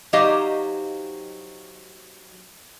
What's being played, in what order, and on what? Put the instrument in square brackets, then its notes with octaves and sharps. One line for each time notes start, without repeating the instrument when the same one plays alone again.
[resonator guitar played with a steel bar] F#3 D#4 G4 C5 D#5 F5